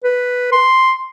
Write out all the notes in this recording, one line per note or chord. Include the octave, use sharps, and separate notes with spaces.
B4
C6